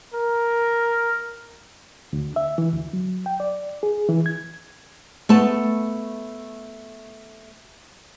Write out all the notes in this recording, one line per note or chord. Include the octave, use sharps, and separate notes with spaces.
A#4
D2
E5
E3
D2
F#3
G5
D5
G#4
E3
G#6
A3 B3 A5